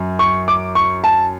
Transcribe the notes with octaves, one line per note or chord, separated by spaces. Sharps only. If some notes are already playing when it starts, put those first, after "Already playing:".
Already playing: F#2
C#6
D6
C#6
A5